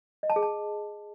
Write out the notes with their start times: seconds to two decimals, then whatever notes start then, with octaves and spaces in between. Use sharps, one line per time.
0.23 D#5
0.30 A5
0.36 G#4
0.43 A5